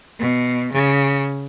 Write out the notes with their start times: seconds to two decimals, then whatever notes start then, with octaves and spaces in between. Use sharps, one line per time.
0.19 B2
0.72 C#3